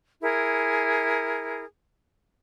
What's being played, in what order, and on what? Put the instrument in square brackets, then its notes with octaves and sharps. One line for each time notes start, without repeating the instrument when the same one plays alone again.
[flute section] E4 G#4 A#4